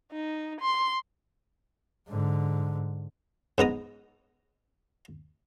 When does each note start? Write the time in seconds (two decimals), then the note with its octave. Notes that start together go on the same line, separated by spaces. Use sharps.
0.12 D#4
0.61 C6
2.08 G#2 D3
3.58 G#2 B3 A#5 D#6